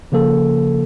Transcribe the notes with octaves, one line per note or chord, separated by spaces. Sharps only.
C#3 F3 A#3 A4